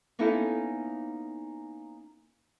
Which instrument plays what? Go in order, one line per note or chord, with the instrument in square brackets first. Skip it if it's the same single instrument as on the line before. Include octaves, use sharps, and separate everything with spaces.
[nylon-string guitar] A#3 B3 C#4 D#4 E4 A4